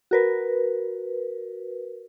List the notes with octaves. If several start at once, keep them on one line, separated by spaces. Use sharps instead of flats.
F#4 A#4 B4